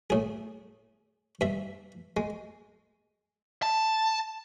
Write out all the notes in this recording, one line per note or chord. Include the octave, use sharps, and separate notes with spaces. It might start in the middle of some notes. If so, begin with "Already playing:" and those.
A2 G#4
G2 E5
G#3
A5